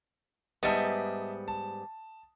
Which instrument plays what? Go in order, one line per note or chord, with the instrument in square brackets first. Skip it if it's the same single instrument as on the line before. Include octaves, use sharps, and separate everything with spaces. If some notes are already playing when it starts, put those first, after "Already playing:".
[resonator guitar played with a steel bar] G#2 G3 B3 [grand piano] D#5 E5 A5
[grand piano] A5